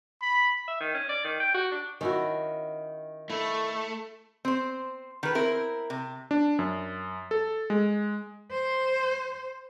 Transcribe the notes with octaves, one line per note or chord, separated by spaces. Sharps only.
B5
E5
D#3
C#4
D5
D#3
G5
F#4
D4
D#3 C#4 E4 F#4
A3 E4
C4 C5
D#3 B4
C4 E4 A#4
C3
D4
F#2
A4
G#3
C5